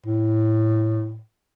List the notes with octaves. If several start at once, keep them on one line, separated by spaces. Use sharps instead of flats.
A2